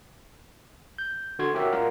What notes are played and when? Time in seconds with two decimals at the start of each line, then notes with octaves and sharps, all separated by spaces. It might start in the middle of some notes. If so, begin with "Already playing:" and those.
0.98 G6
1.39 D3 F#4 C6 G#6
1.54 C#4 F#4 G4 A#4 C#5 E5
1.72 G3 F4 A#4 F5 F#5